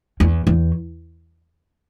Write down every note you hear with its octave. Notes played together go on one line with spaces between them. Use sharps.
E2
E2